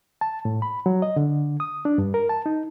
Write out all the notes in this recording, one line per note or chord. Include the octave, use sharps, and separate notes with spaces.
A5
A2
B5
F#3
D#5
D3
D#6
D4
G2
A#4
A5
D#4